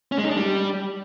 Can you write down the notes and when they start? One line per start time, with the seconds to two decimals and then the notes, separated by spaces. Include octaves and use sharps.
0.12 C#4
0.18 G#3
0.24 D#4
0.30 D4
0.37 G3